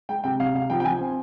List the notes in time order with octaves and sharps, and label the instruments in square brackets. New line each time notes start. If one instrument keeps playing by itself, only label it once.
[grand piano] G#3 G5
C3 G5
C3 F5
C3 F5
F3 G5
G5
F3 G#5
C4